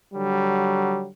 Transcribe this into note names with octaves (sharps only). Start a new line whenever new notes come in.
D3 F#3 G3